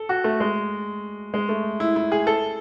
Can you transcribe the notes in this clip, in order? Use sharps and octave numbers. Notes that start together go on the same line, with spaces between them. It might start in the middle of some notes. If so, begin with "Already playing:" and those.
Already playing: A4
F#4
A3
G#3
G#3
A3
E4
E4
G#4
A4